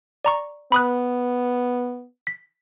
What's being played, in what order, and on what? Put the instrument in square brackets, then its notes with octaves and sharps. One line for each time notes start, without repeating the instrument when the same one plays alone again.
[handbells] D5 A#5 C#6
[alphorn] B3 [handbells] B5 D#6 F#6
[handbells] B6